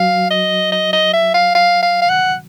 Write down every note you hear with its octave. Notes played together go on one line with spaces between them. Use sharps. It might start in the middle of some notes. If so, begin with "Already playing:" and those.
Already playing: F#3 F#4 F5
D#5
D#5
D#5
E5
F5
F5
F5
F5
F#5